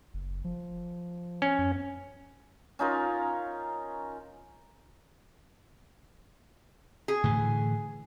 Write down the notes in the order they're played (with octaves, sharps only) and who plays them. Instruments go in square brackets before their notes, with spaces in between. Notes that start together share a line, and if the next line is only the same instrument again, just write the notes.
[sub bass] F#1
F3
[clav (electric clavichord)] C#4
[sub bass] F#2
[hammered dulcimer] C#4 D#4 F4 A#4
[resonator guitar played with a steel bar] G#4
[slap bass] A2 D3 E3